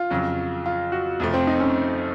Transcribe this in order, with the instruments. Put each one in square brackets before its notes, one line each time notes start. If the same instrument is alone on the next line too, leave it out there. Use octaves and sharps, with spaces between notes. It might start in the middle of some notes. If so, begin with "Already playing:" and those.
Already playing: [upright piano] F4
[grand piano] F2 C#3 F#3
[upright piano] F4
F#4
[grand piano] F2 C3 F3 A3
[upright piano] C4
D#4
C#4